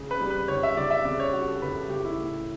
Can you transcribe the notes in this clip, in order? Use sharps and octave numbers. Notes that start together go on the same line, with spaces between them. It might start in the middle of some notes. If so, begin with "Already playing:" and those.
Already playing: C#3
B4
G3
B4
C#2 C#5
E5
C#2 D5
E5
C#3 D5
C#5
G3 F#4
A4
C#2 B4
A4
C#2 G4
E4
A2